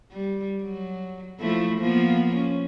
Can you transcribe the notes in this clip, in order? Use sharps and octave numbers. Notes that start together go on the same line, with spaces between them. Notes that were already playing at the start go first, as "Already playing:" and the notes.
G3
F#3
F3 A3 E4
F3 A#3 B3
C#4